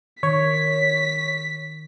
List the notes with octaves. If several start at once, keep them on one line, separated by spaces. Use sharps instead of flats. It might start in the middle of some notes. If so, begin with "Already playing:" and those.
D#3 C#5 B6